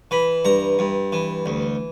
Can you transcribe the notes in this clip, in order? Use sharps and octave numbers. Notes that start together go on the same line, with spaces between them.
E3 B5
G2 A#5
G2
E3
D2